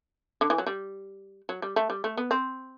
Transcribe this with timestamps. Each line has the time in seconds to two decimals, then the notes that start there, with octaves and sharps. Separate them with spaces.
0.41 D3
0.50 E3
0.58 F#3
0.66 G3
1.49 F#3
1.62 G3
1.76 A3
1.90 G3
2.04 A3
2.17 B3
2.31 C4